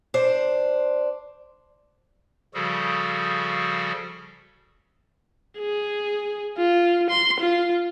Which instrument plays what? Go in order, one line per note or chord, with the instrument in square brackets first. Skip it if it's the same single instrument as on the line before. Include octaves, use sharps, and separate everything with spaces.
[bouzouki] D4 C5
[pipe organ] C#3 F3 G3 F#4 G#4 A4
[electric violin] G#4
F4
C6
F4